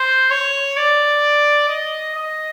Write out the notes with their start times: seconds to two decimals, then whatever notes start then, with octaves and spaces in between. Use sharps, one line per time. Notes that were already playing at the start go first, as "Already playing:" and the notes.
Already playing: C5
0.31 C#5
0.77 D5
1.69 D#5
2.15 D#5